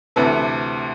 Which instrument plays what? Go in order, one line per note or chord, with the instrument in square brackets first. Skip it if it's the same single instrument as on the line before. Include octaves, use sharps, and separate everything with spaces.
[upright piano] D2 C3 E3 A4 B4